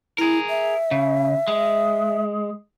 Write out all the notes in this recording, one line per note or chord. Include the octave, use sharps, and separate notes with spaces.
E4 G#4 A#4
E5
C#3
G#3